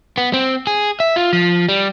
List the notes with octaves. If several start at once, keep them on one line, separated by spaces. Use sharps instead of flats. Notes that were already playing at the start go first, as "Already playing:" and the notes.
B3
C4
G#4
E5
F4
F3
G3